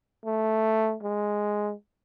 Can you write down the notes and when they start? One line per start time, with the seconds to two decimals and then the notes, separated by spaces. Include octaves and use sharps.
0.25 A3
1.02 G#3